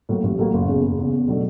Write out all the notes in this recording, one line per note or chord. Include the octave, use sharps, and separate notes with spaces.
A2 F#3 A#3
A1
A2 F#3 A#3
F#1
E2 C#3
F#1
E2 C#3
E2
B2 F#3 A3 D4